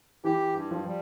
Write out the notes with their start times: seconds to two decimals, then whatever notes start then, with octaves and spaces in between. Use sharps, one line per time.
0.24 E3 G4
0.55 G2
0.71 F3
0.86 G3